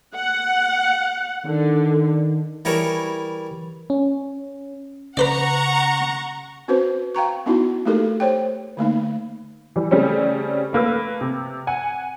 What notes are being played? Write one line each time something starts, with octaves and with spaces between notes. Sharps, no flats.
F#5
D3 D#3
E3 G3 E4 G#4 A#4 C#5
C#4
C#3 B4 C5 D5 F#5 A#5 C#6
C4 C#4 F#4 B4 C5
F5 G5 A#5 C#6
B3 C#4 D#4 E4 F#4
A3 A#3 D#4 G4 A4 A#4
C5 C#5 G5
D3 A3 A#3 D#4
E3 G3
C#3 G3 A3 C4 C#4
A3 A#3 B4 E6
C3
F#5 G#5